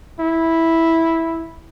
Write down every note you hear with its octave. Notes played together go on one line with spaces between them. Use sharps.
E4